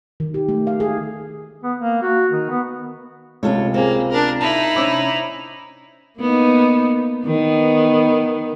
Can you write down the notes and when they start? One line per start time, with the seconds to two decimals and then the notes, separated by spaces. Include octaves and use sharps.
0.20 D#3
0.34 G4
0.49 A3
0.67 F5
0.80 G#4
1.63 B3
1.79 A#3
2.02 F#4
2.31 D#3
2.50 B3
3.43 C#2 C3 F4 A4 C#5
3.74 A#3 C4 G#4
4.11 D4 A#4
4.41 D#4 E4 A5
4.75 C3 C#4 D4 B5 D6 E6
6.19 A#3 B3 D#4
7.26 D#3 B3